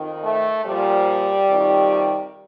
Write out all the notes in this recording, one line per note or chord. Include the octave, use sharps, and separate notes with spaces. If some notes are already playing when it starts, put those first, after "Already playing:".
Already playing: F2 D#3
A3
A#2 F3 G3
F2 C3 D#3